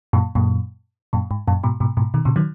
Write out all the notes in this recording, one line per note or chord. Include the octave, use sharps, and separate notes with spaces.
F#2 A#2
F#2 A#2
F#2 A#2
G#2
F#2 A#2
G#2 B2
G#2 B2
G#2 B2
B2 D#3
A#2 C#3
D#3 F#3